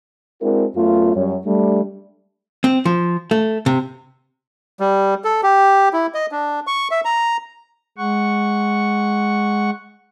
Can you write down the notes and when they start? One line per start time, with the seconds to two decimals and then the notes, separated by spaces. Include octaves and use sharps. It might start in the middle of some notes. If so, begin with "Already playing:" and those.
0.41 G#3 C4 D4 E4 F#4 A#4
0.76 F#2 A3 B3 F4
1.15 F#2 G3 C#5
1.45 G3 A3 D4
2.64 C4
2.85 F3
3.31 A3
3.66 C3
4.80 G3
5.24 A4
5.43 G4
5.93 E4
6.14 D#5
6.32 D4
6.67 C#6
6.91 E5
7.05 A#5
7.98 G#3 F#5 C#6